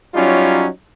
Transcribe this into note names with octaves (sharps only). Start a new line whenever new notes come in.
F#3 G3 C#4 D#4 F4